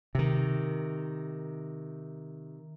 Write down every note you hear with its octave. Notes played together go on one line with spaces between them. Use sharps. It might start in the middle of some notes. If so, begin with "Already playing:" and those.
C3 D#3